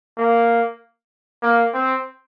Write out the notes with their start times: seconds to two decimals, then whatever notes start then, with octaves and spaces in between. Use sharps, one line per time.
0.18 A#3
1.42 A#3
1.74 C4